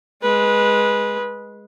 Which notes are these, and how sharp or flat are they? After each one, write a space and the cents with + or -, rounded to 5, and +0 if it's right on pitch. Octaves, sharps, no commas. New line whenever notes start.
G#3 +0 B4 -20